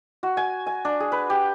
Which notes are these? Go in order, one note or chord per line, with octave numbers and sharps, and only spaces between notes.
F#4
G#5
G#5
D4
G#4
B4
G4